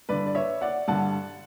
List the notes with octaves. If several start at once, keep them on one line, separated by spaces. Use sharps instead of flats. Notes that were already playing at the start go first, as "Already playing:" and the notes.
G2 D3 B4 D5
D5
C#5 E5
D5 F#5
G2 D3 F#5 A5